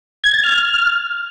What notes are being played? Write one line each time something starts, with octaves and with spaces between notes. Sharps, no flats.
G#6
A6
F6